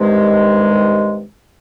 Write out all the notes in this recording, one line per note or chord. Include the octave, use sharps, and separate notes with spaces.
G2 C3 D#3 G#3